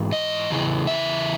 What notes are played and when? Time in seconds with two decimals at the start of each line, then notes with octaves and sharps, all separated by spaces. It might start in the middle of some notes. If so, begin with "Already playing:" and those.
Already playing: G#2 E3
0.13 D#5
0.50 E2 C#3 E3
0.87 E5